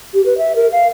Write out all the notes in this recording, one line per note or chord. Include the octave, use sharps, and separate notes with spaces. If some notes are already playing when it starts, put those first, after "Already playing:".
G4
B4
E5
A#4
F5